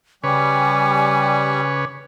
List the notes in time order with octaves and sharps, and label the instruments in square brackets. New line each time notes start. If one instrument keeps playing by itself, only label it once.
[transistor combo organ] C#3 B4 C#5 [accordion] G3 [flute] G#5 [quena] D6